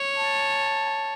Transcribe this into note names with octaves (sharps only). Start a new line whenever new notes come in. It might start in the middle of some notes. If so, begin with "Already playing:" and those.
Already playing: C#5
A5